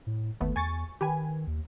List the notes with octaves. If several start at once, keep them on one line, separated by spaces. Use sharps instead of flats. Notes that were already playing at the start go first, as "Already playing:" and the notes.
A2
G1 D#2 A3 B3
E2 G#5 C#6 A6
D#3 G4 B4 G#5
D#2